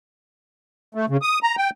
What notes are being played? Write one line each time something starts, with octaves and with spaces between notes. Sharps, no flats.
A3
C#3
D#6
A#5
G5